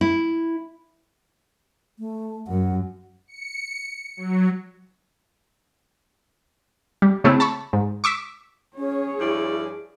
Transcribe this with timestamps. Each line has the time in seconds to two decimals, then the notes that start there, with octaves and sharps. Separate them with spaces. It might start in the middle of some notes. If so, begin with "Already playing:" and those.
0.01 E4
1.99 A3
2.47 F#2 F#5
3.27 C#7
4.17 F#3
7.02 G3
7.24 C#3 A3 C4 E4
7.40 A5 B5 C#6
7.73 G#2
8.04 C#6 D6 E6 B6
8.77 C#4 G#4 C#5
9.20 G2 F3 E4 D5